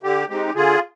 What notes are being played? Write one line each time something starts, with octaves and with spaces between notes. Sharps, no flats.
D3 G4
G#3 C4 D#4 G4
D3 F4 G#4